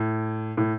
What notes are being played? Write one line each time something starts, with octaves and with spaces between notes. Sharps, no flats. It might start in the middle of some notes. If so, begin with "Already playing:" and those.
Already playing: A2
A2